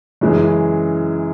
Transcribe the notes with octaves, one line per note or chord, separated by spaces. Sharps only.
F#2 C#3 E3 G#3